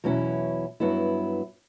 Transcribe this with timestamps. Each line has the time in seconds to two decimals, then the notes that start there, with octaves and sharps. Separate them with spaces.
0.04 E2 B2 F#3 C#4 E4
0.80 G2 F#3 B3 E4